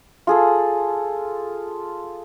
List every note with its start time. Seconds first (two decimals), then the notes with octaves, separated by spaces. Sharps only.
0.27 F4 G#4 A4